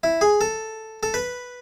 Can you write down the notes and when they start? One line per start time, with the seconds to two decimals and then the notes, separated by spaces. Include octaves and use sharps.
0.03 E4
0.21 G#4
0.41 A4
1.03 A4
1.14 B4